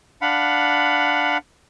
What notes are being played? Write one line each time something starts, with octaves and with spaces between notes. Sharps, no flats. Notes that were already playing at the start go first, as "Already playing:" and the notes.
D4 F5 F#5 B5